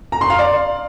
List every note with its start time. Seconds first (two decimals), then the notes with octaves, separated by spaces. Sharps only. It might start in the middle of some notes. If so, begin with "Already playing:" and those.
0.12 A#5
0.21 C6
0.30 F5
0.39 D5